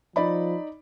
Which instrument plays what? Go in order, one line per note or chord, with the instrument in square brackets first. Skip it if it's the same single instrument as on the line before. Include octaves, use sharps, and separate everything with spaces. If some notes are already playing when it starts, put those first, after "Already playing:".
[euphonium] F3 [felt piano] D#4 D5 B5